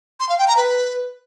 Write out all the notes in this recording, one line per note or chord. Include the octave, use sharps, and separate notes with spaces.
C6
F5
G5
A#5
B4